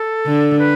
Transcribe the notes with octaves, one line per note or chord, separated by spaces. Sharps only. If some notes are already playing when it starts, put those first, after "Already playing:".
Already playing: A4
D3
B4